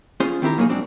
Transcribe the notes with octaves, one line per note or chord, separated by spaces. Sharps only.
C#4 F4 G#4 C5
D#3 C4 E4 G4 A#4
A#2 F#3 A#3 D#4 G#4
G#2 F#3 C4 D4